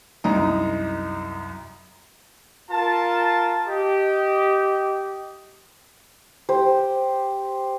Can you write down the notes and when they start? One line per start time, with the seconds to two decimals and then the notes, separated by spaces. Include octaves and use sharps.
0.24 C2 F#2 D#4 A#5
2.71 F4 A#4 A5
3.67 G4 D#5
6.49 G4 C5